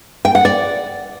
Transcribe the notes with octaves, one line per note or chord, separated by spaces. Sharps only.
G5
F#5
D5